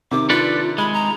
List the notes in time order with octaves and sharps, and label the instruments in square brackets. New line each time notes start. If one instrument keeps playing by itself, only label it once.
[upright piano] C3 D#3 [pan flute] D6
[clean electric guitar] D4 A4 B4 [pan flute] F4
[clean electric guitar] G#3 [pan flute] B5
[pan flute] A#5